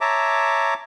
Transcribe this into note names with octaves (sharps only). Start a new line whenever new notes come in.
C#5 E5 A5 A#5 D6